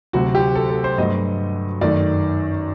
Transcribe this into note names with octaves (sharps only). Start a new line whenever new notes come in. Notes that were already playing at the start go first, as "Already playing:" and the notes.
D2 C3 F#3 F#4
G4
A4
A4
C5
G2 F#3 A3 D#5
F#2 D#3 A3 D5